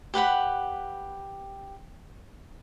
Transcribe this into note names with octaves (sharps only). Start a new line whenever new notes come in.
G4 B4 F#5 B5